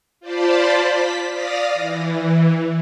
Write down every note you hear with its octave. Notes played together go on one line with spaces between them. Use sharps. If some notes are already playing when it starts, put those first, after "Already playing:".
F4 C5 D5 A5 B5
B6
D5 F5 D#6 A#6
E3